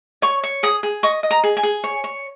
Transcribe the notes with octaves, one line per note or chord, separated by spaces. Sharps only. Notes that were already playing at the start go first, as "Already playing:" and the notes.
C#5 C#6
C#5
G#4 D#6
G#4
D#5 C#6
D#5
A#5
G#4
G#5
G#4
C#5
C#5